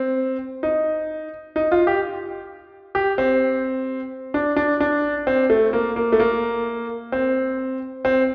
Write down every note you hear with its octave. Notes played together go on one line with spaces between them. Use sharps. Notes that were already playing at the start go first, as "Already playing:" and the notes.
Already playing: C4
D#4
D#4
F4
G4
G4
C4
D4
D4
D4
C4
A3
A#3
A#3
A3
A#3
C4
C4